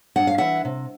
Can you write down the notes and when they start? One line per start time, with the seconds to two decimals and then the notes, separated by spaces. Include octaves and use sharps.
0.16 G2 F#5
0.27 F5
0.38 E3 E5 F#5
0.65 C3